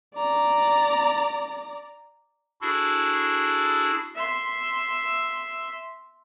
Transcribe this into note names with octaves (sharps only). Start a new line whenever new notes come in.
D5 A#5
D4 E4 F#4 G#4 A4
E5 C6